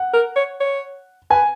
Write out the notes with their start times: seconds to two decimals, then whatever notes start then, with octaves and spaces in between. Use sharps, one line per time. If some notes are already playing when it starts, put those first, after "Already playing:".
Already playing: F#5
0.14 A#4
0.36 C#5
0.60 C#5
1.31 B4 G#5